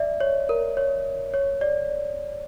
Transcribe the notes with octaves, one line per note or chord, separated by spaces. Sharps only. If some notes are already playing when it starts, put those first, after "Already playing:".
Already playing: D5 E5
C#5
A#4
C#5
C#5
D5